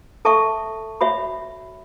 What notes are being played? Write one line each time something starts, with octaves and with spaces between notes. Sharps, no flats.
A4 E5 A5 C#6
F#4 C#5 E5 B5